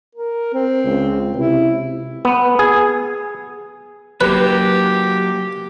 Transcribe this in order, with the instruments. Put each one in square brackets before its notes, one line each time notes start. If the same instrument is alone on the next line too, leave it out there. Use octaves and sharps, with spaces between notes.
[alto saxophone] A#4
C4
[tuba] C#2
[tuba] C3 [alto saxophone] E4
[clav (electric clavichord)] B3
G#4
[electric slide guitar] F#3 A#3 [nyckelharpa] G4 [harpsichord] B4